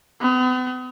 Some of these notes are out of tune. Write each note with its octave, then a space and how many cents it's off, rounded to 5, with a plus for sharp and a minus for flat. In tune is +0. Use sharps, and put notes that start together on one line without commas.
B3 +40